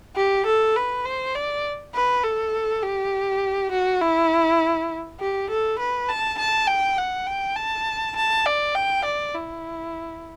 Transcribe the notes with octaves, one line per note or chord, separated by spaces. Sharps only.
G4
A4
B4
C5
D5
B4
A4
G4
F#4
E4
G4
A4
B4
A5
A5
G5
F#5
G5
A5
A5
D5
G5
D5
E4